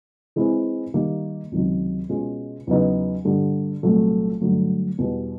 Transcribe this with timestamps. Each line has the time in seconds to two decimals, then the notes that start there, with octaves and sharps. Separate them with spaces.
0.36 E3 G#3 C4 E4
0.94 D#3 G3 A#3
1.52 C#2 C3 D#3 F#3
2.09 B2 G#3 C#4 F4
2.67 E2 C#3 F#3 B3 D#4
3.25 G2 D3 G3
3.83 C2 A#2 F#3 A3
4.40 G2 D3 F#3 A3
4.98 E2 B2 G3